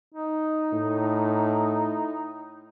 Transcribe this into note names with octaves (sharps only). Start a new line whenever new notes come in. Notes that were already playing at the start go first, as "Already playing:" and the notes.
D#4
A2